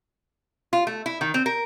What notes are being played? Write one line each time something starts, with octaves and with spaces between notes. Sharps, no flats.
F4
A3
E4
D#3
C4
A#4